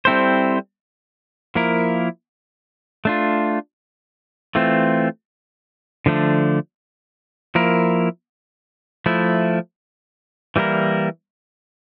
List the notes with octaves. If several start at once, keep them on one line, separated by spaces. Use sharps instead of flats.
G3 C4 E4 A4 C5
F3 A#3 E4 A#4
A3 D4 F4
E3 A3 C4 F4
D3 F3 A3 D4
F3 A#3 E4 A#4
F3 A3 E4
E3 G3 A#3 E4 A#4